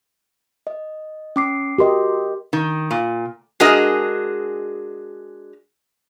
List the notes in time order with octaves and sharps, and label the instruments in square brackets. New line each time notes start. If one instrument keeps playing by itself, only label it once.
[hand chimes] D#5
C#4 D6 C7
[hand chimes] F#4 C6 [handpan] G4 A#4 D#5
[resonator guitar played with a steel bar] D#3
A#2
G#3 D4 F#4 G#4 A#4 D#5